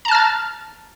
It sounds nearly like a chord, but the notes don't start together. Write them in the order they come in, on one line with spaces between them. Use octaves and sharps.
A#5 A5 F6 A6